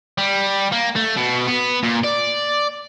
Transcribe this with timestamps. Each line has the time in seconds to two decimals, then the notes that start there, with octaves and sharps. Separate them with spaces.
0.18 G3
0.72 A#3
0.96 A3
1.17 B2
1.48 B3
1.83 A#2
2.04 D5